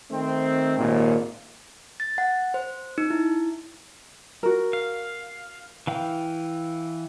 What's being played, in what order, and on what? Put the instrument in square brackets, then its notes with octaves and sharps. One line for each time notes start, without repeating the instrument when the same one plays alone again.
[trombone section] D#3 A3 C4
G#1 D#2 A#2
[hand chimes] A6
F#5
C5
D#4
E4
[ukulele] F#4 A#4
[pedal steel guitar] F5
E3 F5 G5